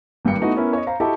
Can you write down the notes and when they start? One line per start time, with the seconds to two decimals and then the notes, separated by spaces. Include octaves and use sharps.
0.25 G#1 G2 A#3 G5 C#7
0.41 A3 B3 D#4 E4 F#4
0.56 B3 C#4 E4 A#4
0.73 C#5 D#5
0.87 C5 F5 A#5
1.00 E4 F#4 G4 A4 D#5 A5